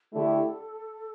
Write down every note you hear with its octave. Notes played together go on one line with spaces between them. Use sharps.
D3 A3 E4 G4 A4